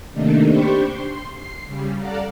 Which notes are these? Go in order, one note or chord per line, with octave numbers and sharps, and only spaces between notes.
C3 D#3 A3 A#3 D4 D#4
D4 G4 C5 G5 B5 C#6
C6
C7
C#3 G3
A4 D5 F5 F#5 A#5